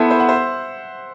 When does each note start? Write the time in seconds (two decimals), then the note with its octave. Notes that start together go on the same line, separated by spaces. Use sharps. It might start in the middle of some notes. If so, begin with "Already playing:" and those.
Already playing: B3 E4 A4 C5
0.10 C5 E5
0.20 F#5
0.29 C5 E5